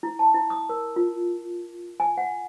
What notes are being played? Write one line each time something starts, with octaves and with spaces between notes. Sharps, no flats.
E4
A5
E4
D#6
A#4
F4
G#5
F#5